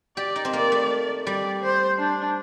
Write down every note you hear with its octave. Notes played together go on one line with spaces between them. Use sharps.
G4 D5
D#4
C4
A#3 D5
A3
G3 D5
C5
D4